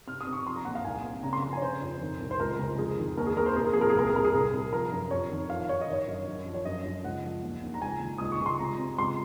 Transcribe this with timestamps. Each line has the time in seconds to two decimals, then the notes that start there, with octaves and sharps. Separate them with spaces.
0.07 C3 F6
0.21 D#6
0.27 C3
0.33 C#6
0.46 F3 C6
0.56 A#5
0.65 D#2 F#5
0.75 F5
0.84 C2 G#5
1.04 C3
1.23 C#3 A#5
1.33 C6
1.43 F3 A#5
1.53 G#5
1.57 C#5
1.62 C#3 C5
1.82 F2
2.01 D#3
2.20 C2
2.31 C5
2.40 C#2 A#4
2.59 C#2
2.78 F2 G#4
2.98 D#3
3.17 D#2 A#4
3.27 G#4
3.36 D#2 A#4
3.46 C5
3.56 C3 G#4
3.64 A#4
3.73 F3 G#4
3.81 A#4
3.90 G#4
3.95 C2 A#4
4.07 G#4
4.15 C2 A#4
4.25 G#4
4.34 C2
4.53 C2
4.72 F3 A#4
4.92 F#2
5.11 F2 C#5
5.31 D#3
5.50 F3 F5
5.69 F3 C#5
5.81 D#5
5.88 D#3 C#5
6.07 F#2
6.27 F#2
6.46 F3
6.54 C#5
6.65 F#2 D#5
6.85 F#2
7.04 C#2 F#5
7.24 F3
7.43 D#2
7.63 D#2
7.74 A#5
7.82 C#2 G#5
8.02 D#3
8.18 C#2 D#6
8.32 C#6
8.40 C#2
8.46 C6
8.59 C3 A#5
8.79 C3
8.98 C#2 C6